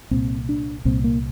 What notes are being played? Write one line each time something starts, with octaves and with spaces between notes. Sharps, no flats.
C2 A#2 C4
D4
C2 A#2 C4
A#3